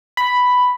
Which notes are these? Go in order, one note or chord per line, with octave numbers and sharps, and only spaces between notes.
B5